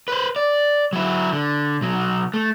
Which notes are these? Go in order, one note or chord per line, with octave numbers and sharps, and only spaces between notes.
B4 C5
D5
F#3 E4
D3
B1 F#3
A3